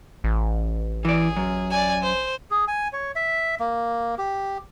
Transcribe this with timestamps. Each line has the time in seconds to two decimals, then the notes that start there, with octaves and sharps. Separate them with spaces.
0.24 A1
1.05 E3 G#4 D5
1.36 F#2
1.70 D5 G#5
2.02 C5
2.51 G#4
2.68 G#5
2.93 C#5
3.16 E5
3.60 A#3
4.18 G4